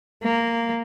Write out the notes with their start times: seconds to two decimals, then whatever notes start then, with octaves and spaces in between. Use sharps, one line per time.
0.23 A#3